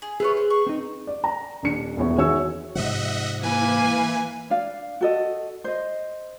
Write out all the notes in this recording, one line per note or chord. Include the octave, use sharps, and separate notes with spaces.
G#4
E4 F4 G#4 B4 C#5
C5
C#6
C4 D#4
D5
A#5
D#1 D4 C#7
E1 E2 E3 C#5
D#3 F#4 G#4 C#5 E5 E6
G#2 C3 F3 D#5 E5 F#5
E3 A#3 B4 G#5
D4 D5 F5
F#4 A4 D#5
C5 D#5